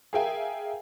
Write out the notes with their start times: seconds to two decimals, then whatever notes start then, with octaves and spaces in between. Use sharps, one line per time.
0.13 G#4 A#4 E5 F5 G5 G#5